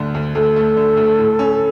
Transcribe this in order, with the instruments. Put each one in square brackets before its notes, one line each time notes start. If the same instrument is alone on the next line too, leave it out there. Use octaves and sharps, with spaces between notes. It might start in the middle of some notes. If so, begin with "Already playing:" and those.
Already playing: [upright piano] D2 D3 A3
D2
[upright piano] D2 [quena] A4
[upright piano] A3
D3
D2
A2
C#4